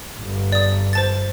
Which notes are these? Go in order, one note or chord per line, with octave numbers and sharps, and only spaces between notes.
G1
D5 D#6
C5 A5 A6